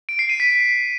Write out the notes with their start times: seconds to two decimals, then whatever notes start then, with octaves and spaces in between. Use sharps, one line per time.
0.09 D7
0.19 C7
0.29 D#7
0.40 B6